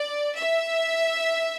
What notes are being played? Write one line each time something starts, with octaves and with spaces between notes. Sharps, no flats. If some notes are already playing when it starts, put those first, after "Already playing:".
Already playing: D5
E5